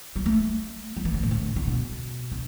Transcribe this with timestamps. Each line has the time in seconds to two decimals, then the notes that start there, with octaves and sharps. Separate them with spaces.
0.16 G3
0.26 A3
0.97 G3
1.05 E3
1.14 D3
1.23 A2
1.31 D3
1.56 D3
1.67 B2
2.32 D3